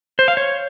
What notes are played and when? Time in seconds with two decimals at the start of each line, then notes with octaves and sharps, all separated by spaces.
0.19 C5
0.28 F5
0.37 C#5